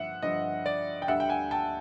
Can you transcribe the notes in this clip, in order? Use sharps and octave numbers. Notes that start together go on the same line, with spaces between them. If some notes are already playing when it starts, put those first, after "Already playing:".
Already playing: G2 D3 F3 E5 F#5
G2 D3 F3 D#5
D5
G5
D2 D3 G3 E5 F#5
G5
F#5 G#5
G5 A5